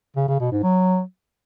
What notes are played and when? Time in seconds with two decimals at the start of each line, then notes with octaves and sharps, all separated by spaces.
0.17 C#3
0.28 C#3
0.40 B2
0.51 G#2
0.63 F#3